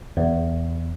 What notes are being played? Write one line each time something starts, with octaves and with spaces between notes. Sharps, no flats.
E2